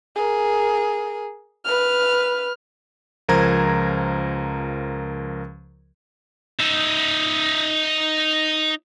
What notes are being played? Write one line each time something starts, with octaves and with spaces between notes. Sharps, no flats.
G#4 A#4
B4 F6
C#2 F3 A#4 C5 A#5 G#6
D#4 E5